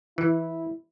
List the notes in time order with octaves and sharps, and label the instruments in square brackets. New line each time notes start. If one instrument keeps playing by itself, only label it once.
[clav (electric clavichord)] E3 [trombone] E4